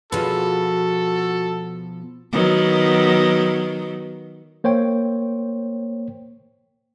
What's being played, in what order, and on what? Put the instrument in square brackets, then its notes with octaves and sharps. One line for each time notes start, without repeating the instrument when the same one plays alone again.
[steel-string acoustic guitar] B2 F3 [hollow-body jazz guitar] F4 G#4 B4 [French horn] F#4 [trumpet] A4
[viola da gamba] D#3 F#3 B3
[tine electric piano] A#3 C5 C#5 G5